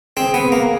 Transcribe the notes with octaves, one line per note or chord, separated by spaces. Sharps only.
C4 G#4
B3
A#3